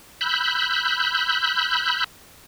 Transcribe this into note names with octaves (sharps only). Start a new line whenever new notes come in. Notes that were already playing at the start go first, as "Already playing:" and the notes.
B5 E6 F#6 G6